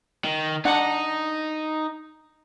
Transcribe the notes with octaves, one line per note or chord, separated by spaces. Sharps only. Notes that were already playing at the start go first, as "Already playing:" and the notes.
D#3
D4 D#4 F#5